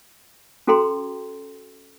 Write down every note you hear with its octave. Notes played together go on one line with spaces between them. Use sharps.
C#4 F#4 A4 G5 A#5 C6